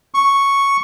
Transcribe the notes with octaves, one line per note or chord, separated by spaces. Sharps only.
C#6